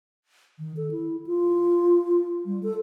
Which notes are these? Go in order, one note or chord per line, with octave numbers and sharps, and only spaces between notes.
D#3
A4
E4
F4
G3
A4